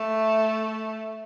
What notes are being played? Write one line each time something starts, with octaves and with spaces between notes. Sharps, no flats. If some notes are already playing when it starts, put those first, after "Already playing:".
Already playing: A3